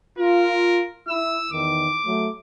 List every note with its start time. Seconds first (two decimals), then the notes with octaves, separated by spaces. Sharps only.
0.18 F4 A#4
1.08 E4 E6
1.52 E2 D#3 D6
2.06 F#3 A3